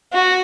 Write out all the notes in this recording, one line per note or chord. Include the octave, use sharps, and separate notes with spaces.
F#4